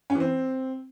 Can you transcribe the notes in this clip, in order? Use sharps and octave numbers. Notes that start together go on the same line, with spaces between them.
C#4
E3
C4